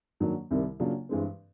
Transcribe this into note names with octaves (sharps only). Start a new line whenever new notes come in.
G#2 D#3 F#3 A#3 D4
C2 C3 D#3 G3
C#3 F#3 A#3 D4 F4
G2 E3 G#3 C4